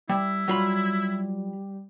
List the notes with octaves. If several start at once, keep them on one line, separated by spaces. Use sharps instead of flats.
G3 E4
F#3 G3 F4 B5